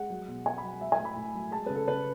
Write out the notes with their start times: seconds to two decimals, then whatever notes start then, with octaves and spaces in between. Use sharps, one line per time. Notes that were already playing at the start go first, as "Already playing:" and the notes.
Already playing: G#3 F#5
0.10 F#3
0.27 B2
0.45 B2 G#5
0.58 B5
0.63 F#3
0.81 F#3 E5
0.92 G#5
0.98 A2
1.05 B5
1.16 A2
1.35 F#3
1.51 G#3 A5
1.66 C#3 B4
1.75 A4
1.87 C#3 B4